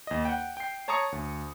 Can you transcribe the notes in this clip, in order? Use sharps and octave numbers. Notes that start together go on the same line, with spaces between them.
D#2 D#5
F#5 G5
G5 C7
C#5 A5 A#5 C#6 D#6 C#7
D2